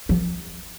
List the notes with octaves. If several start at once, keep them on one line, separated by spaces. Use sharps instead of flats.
F3